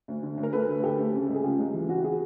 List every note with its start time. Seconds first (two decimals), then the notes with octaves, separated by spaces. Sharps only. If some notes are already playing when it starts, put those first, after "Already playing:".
0.08 D2
0.23 D3
0.37 D2
0.43 A#4
0.53 D2 A4 B4
0.68 D3
0.83 D2 G4 A4
0.99 D2
1.14 C#3
1.29 C#2
1.34 G#4
1.43 C#3 F4 G4
1.59 C#2
1.74 E3
1.88 E3 F#4
1.97 G4
2.04 F#4 G#4